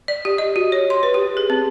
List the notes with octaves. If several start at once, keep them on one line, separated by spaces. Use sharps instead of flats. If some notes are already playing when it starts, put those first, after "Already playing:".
D5
G4
D#5
F#4
C#5
C6
B4
G4
G#4
C4